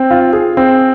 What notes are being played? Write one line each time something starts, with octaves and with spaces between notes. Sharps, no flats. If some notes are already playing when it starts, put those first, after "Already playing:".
Already playing: C4
F4
G#4
C4